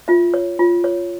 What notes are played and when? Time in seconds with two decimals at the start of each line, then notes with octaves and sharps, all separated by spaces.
0.08 F4 E5
0.34 C#5
0.59 F4
0.84 C#5